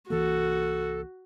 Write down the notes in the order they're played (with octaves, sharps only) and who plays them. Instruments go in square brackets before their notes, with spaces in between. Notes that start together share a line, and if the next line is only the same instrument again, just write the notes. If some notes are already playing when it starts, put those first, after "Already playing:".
[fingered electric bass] C2 E3 A#3 [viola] F#4 [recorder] A4